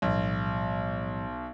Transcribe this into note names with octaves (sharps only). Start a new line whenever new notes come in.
B1 A2 F3 G3